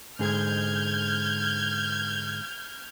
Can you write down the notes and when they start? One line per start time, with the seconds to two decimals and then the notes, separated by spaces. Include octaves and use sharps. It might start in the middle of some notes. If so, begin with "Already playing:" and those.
0.19 G#2 D3 G#4 F6 G6 G#6